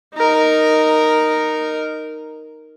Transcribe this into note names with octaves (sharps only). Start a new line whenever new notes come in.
D#4 A#4